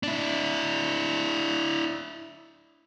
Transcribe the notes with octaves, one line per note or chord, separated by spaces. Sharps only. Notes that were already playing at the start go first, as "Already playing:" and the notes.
D4 E4